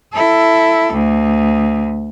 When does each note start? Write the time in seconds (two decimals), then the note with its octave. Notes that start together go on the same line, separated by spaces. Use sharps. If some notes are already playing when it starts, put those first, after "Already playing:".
0.13 E4 A4
0.93 D2